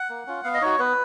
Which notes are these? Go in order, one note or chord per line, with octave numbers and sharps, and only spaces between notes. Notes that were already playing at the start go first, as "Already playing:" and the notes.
Already playing: F#5
A#3
C#4 F4
B3 F5
D#5
D#4 F#4 C#5
B3 B4